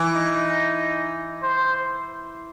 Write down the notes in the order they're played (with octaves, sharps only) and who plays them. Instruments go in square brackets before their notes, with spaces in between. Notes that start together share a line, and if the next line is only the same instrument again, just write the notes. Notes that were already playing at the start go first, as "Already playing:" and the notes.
Already playing: [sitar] E3
[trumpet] D#4
C5